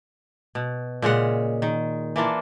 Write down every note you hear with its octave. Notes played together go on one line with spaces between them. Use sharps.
B2
A#2 C#3 G#3 F#5
D#3
E3 A#3 D4 F4